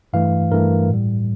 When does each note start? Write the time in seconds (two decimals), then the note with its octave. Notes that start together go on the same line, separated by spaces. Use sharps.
0.13 G2 E3 A3 F5
0.51 G2 E3 A3 A#4
0.89 A2 G3